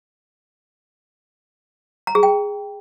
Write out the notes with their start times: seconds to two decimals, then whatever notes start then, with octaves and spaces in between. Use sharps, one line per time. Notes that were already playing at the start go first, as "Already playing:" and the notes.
2.07 A#5
2.15 G#4
2.23 G5